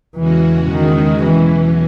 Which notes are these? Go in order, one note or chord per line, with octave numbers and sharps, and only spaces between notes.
E2 C#3 E3 G#3 C#4 F#4
D#3
E2 B2 E3 F#3 C#4